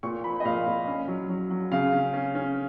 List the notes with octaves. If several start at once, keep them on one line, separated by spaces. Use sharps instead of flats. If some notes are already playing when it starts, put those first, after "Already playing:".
A#2 C#6
F3 B5
D#5
A#2 F5
A#2
C#4
F#3
F#3
F#3
C#3 F5
C#4
C#4
C#4